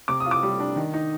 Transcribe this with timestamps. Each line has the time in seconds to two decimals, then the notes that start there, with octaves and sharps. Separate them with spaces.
0.08 C3 D6
0.20 D#6
0.26 F4
0.31 D6
0.43 G3
0.60 D4
0.76 D#3
0.94 D#4